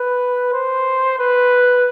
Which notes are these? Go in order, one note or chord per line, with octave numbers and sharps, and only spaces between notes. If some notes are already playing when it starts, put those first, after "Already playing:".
Already playing: B4
C5
B4